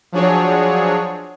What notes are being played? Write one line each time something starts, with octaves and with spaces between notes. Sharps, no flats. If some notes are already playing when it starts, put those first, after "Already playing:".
F3 F#3 D4 G#4 C#5